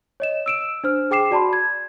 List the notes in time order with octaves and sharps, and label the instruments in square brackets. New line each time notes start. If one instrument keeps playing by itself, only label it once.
[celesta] C#5 D#5 E7
E6 D7 E7
D4 C5 F6
G#4 G5 D6 C7 E7
F#4 D5 A5 B5 C6
G#6